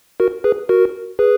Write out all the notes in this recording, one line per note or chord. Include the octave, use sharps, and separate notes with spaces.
F#4 A#4
G#4 B4
F#4 A#4
G#4 B4